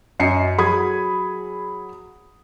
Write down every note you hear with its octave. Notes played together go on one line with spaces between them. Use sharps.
F#2 D#5 C7 C#7
F#3 G#4 B5 D#6 G#6